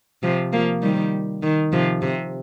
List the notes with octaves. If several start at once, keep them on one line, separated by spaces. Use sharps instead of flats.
C3 F3
F3 A#3
D#3 G3
D#3
C3 F3
C3